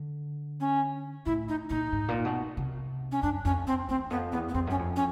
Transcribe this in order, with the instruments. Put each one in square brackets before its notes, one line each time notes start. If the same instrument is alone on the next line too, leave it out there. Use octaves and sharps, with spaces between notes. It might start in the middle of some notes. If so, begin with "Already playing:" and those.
Already playing: [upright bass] D3
[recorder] C#4
[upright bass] A2 [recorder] E4
[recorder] D#4
[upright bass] A#2 [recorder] D#4
[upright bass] G#2
A#2
B2
C3
[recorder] C#4
[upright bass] F#2 [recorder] D4
[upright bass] F2 [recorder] C#4
[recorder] C4
[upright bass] E2 [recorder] C4
[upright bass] F2 [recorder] B3
[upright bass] E2 [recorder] B3
[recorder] B3
[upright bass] F2 [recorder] C4
[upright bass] F#2 [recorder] C#4
[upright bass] F2
[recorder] C#4